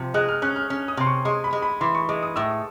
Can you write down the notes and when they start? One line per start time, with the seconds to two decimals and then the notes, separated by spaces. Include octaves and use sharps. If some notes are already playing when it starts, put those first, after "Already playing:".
Already playing: C3 F3
0.14 G#3 F#6
0.29 F6
0.42 C#4 F#6
0.56 F6
0.70 C#4
0.88 D#6
0.97 C3 C6
1.07 C#6
1.25 G#3 C6
1.44 B5
1.53 G#3
1.62 B5
1.81 E3 C6
1.95 C#6
2.09 G#3 D6
2.23 D#6
2.36 A2 E6